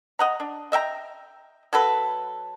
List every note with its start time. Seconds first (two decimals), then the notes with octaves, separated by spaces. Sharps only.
0.19 D#5 F#5 A#5
0.40 D4
0.72 D#5 E5 G5 A#5
1.73 F#3 A4 B4